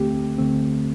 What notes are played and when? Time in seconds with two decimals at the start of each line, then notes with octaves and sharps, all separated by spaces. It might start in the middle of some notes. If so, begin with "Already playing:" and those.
Already playing: D2 D3 A3 C4 G4
0.38 D2 D3 A3 C4